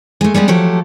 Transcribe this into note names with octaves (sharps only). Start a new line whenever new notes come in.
G#3 A3
G3 G#3 B3 G4
F3 F#3 A3 G4 A4